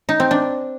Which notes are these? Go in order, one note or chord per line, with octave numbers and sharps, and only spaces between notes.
D#4
C4
D4